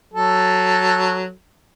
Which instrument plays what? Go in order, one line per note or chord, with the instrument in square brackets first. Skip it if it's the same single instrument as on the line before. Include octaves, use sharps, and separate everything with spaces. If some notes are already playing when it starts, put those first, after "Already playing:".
[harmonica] F#3 A4